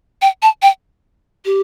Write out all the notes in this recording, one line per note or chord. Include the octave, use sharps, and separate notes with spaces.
G5
A5
G5
G4